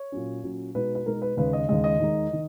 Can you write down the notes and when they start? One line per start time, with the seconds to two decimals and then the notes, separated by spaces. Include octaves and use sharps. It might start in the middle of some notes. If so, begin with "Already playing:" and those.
Already playing: C#5
0.12 A#2 F#3 C#4
0.43 A#2 F#3 C#4
0.75 B2 G#3 D#4 B4
0.95 B4
1.06 B2 G#3 D#4 A#4
1.22 B4
1.37 D#2 C#3 G#3 B4
1.53 D#5
1.69 D#2 C#3 G#3 D#5
1.84 D#5
2.00 D#2 D#3 G#3 D#4
2.33 D#3